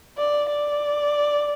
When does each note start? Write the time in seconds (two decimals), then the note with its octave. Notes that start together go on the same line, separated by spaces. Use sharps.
0.18 D5
0.49 D5